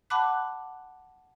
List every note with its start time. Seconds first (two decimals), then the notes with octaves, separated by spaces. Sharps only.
0.10 F#5 A5 B5 D6 F#6